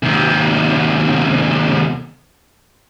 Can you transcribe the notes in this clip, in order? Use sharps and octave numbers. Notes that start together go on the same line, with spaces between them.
D#2 C3